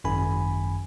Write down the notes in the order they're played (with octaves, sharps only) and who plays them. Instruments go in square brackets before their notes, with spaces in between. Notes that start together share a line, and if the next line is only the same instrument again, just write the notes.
[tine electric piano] G#1 F#2 G#5 B5